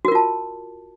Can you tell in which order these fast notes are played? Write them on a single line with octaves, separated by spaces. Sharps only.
F#4 A#4 F4 A5